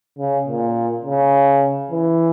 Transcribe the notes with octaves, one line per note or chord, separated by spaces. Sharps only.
C#3
A#2
C#3
E3